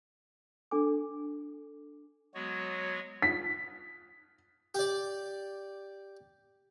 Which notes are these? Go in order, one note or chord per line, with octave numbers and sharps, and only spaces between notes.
D4 A4 G#5 D6
F#3 G#3 B3 F#4 C#5
B6
G4 D5